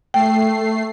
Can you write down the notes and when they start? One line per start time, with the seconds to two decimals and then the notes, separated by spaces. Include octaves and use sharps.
0.14 A3 G5 C7